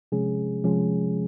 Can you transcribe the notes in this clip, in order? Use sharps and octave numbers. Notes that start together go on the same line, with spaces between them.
C3 F3 G#3 C#4 G#4
C3 F3 G#3 C#4 G#4